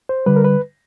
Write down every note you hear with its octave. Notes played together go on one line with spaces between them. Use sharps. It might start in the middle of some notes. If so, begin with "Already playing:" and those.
C5
D3 G3 B4
A#4
B4